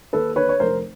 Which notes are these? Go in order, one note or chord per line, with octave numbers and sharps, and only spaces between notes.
D#2 A4 B4
D3 B4 C#5
C#5
F1 A#4 C5